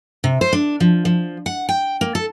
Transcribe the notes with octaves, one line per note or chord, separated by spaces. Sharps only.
C3
C5
D4
F3
F3
F#5
G5
A#3
A4